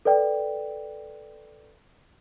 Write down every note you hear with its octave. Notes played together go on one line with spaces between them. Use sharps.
A4 B4 D5 G5